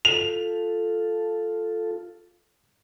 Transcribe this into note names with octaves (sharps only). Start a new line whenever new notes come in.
F4 A4 F7